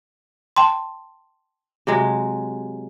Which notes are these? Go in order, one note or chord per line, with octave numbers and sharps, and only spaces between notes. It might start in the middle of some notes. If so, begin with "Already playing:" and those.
G5 A5 C6
C3 F#3 G#3